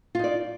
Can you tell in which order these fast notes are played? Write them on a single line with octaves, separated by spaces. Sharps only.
F4 D#4 D5